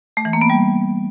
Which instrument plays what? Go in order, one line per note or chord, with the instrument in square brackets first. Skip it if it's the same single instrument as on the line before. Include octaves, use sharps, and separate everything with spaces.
[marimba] A3
E3
A#3
B3
G3